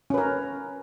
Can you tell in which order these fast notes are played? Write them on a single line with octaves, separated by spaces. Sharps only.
C#4 B4 A#4